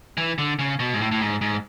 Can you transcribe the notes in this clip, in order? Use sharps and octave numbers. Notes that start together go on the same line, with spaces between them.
E3
D3
C#3
B2
G#2
A2
A2
G#2
G#2